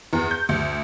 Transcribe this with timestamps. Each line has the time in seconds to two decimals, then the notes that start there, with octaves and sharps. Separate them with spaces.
0.13 E2
0.31 G6
0.49 D2